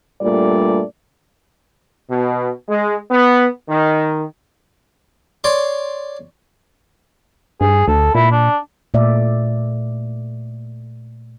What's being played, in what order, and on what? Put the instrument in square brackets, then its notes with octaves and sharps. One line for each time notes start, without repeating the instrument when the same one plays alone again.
[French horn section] G2 A#2 G3 A3 D5
[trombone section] B2
G#3
B3
D#3
[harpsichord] C#5 D5 C6
[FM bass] G2 [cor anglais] G#4
[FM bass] D2 [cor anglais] A4
[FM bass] A#2 [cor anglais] E4
[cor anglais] D4
[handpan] A#2 A3 D5 E5